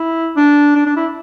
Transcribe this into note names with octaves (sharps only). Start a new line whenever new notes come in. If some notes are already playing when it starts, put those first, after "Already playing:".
Already playing: E4
D4
D4
D4
E4